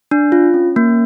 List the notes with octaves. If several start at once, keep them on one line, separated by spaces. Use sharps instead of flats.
D4
F4
C#4
A#3